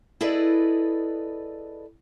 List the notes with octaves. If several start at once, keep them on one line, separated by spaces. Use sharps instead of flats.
E4 G#4 A4 B4 D5 D#5